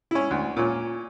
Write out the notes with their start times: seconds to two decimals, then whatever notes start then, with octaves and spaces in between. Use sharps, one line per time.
0.11 C#4 E4
0.31 D2
0.57 A#2 C#4